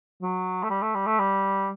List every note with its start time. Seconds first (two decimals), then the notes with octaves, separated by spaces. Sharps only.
0.22 F#3
0.63 A3
0.70 G3
0.82 A3
0.95 G3
1.06 A3
1.19 G3